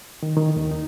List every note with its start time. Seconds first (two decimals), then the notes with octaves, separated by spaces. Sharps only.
0.23 D#3
0.37 D#3
0.56 D#2
0.71 D#4